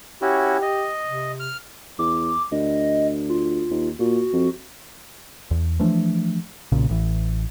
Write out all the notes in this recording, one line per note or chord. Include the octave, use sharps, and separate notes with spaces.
C#4 E4 F#4 G4
D#5
C3
F6
E2 D6
D2 D#5
F4
D#2
A#2 F#4
F2
E2
E3 F3 A3 D4
B1 A#2 C#3
A1 E3